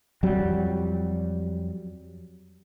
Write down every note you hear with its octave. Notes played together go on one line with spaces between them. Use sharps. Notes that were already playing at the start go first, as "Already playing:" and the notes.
F2 F#3 G3